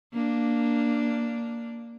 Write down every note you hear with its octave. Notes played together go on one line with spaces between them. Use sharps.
A#3 D4